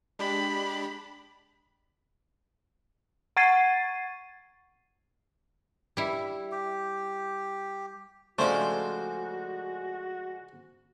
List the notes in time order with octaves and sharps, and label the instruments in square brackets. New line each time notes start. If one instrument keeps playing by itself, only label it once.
[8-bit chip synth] G#3 D4 G4 [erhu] B5
[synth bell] F#5 C#6 G#6 A6 C7 D#7
[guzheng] G3 E4
[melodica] G4
[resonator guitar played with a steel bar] C#3 F3 G#3 [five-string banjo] A3 [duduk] F#4 [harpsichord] C5 D5